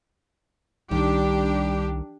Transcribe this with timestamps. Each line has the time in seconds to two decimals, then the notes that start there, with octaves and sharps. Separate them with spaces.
0.91 C2 D#3 G3 D4 G4